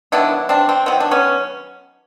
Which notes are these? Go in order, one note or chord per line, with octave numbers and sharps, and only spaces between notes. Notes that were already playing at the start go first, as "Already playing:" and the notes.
D#3 F#3 B3 D4 E4
C4 D4
C4
D#3 F#3 B3 C4
D4
B3 C#4